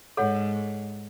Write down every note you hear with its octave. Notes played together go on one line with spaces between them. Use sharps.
G#2 A4 C#5 F#5